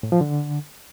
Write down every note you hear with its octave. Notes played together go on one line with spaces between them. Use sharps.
A2
F3
D3